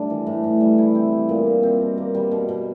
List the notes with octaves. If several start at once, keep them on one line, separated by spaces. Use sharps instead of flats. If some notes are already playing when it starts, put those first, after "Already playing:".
Already playing: G3 A3 D4
E3
A2
A2
G3
E4
C4
G3
A#2
E4
C4
B2
A#3
G3
B2
B2